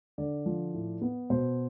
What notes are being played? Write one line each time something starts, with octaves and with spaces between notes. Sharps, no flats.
D3 D5
F3
A2
B3
B2 C5